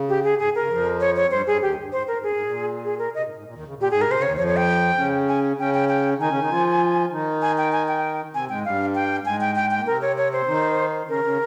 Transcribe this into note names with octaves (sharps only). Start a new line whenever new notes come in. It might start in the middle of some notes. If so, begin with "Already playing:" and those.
Already playing: C#3
G4
G#4
G#2 G#4
C#3 A#4
F2 F3
C#5
C#5
G2 G3 C5
G2 G3 G#4
D#2 D#3 G4
G2
G#2 C5
G#2 A#4
G#2
G2 G#4
G#2
A#2
G#4
A#4
C3 D#5
G#2
G#2
A#2
D#2 D#3
C#3
A#2
G4
G#2 G#4
C3 A#4
C5
C#3
D#2 D#3 C#5
F2 F3 C#5
C#5
G5
C#3 C#4
G#5
C#3 C#4 G5
G5
G5
D#3 D#4 G#5
C#3 C#4
D#3 D#4
F3 F4
D#3 D#4
G#5
G5
G#5
G5
C3 C4 G#5
G#2 G#3 G5
G2 G3 F5
G5
G#2 G#3 G#5
G5
G5
G5
A#3
C3 C4 A#4
C#5
C#5
C5
D#3 D#4
C#3 C#4 A#4
C#3 C#4